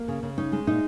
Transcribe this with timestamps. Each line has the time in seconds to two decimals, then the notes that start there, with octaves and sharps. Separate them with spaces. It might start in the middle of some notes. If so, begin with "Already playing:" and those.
Already playing: A#3
0.08 C#3
0.23 C#3
0.38 C#4 D#4
0.52 G#3
0.67 A#2 D#4